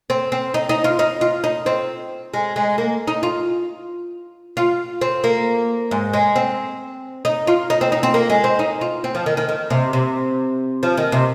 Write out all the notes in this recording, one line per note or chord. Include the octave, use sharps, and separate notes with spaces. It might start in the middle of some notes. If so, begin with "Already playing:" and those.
C4
C4
D#4
D#4
F4
D#4
F4
D#4
C4
G#3
G#3
A#3
D#4
F4
F4
C4
A#3
G#2
G#3
C4
D#4
F4
D#4
C4
D#4
C4
A#3
G#3
C4
D#4
F4
C4
F3
D#3
D#3
D#3
C3
C3
F3
D#3
C3